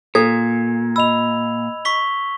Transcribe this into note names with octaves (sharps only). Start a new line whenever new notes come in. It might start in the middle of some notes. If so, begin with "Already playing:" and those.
A#2 A4 G#6
D#5 B5 E6 F7
C#6 B6 G7